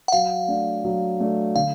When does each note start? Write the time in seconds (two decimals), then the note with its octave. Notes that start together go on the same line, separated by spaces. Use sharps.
0.08 F#5
0.12 F#3 F5
0.48 A3 D4
0.85 F#3
1.20 A3 D4
1.55 D3 F5